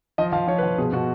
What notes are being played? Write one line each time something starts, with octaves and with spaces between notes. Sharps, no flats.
F3 D#5
F3 F5
F3 C#5
B4
F3
B2 G#4
B2 F#4